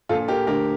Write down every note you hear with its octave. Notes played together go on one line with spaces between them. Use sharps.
A#1 A#2 F4 A4
G4 A#4
D2 D3 G4 A#4